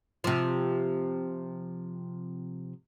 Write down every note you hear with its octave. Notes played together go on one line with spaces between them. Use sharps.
C3 F3